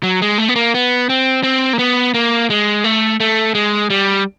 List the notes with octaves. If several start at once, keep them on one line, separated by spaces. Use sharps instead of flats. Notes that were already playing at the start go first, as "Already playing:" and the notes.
F#3
G#3
A3
B3
A#3
B3
C4
C4
A#3
B3
A#3
G#3
A3
A3
G#3
G3